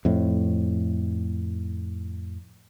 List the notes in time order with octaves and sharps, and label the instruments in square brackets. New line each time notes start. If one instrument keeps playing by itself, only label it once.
[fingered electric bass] F2 A2